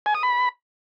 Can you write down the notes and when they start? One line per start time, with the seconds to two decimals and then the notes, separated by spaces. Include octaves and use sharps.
0.06 G#5
0.15 D#6
0.23 B5